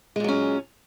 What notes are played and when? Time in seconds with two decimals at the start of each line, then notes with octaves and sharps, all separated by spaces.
0.16 G#3
0.20 A#2
0.24 F#3
0.28 C#4